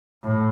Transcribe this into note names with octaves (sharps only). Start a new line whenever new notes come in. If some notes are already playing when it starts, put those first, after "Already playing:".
A2